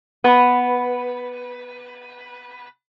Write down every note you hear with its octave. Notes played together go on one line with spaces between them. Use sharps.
B3 B4